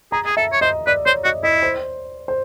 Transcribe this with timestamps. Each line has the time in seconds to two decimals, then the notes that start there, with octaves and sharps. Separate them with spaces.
0.12 G#4 A#5
0.25 G#4
0.37 A4 E5
0.52 C#5
0.61 C5 D#5
0.87 B4 D5
1.06 C5 C#5
1.24 F#4 D#5
1.43 E4 D#5
1.63 C5
2.28 C5